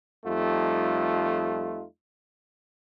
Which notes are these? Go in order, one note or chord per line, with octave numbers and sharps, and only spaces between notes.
F2 G3 A3 D#4 F4